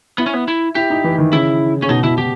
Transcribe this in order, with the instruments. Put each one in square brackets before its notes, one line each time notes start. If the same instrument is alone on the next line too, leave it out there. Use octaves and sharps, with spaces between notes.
[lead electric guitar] B3 [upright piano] E4
[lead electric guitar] C#4
B3
E4
[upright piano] E4 [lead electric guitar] G4
[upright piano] D#4
E3
D#3
[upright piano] C#3 [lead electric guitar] E4
[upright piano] C#3 [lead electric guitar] C#4
[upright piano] B2 [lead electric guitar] D#4
[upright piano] B2 [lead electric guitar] E4
[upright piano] B2 [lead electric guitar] G4